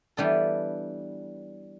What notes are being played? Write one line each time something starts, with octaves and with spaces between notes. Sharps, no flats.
E3 G3 B3 D4 A4